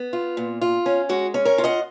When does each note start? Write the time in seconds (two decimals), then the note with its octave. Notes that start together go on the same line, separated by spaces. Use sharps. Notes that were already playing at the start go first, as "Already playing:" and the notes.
Already playing: B3
0.13 F4
0.37 A#2
0.61 F4
0.86 C#4
1.09 G#3 F#4
1.34 C#4
1.45 A#4 C#5
1.58 F4
1.64 D#5 F#5